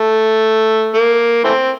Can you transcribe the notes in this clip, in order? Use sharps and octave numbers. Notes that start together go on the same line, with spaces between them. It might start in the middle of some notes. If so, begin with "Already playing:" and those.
Already playing: A3
A#3
E3 A3 C4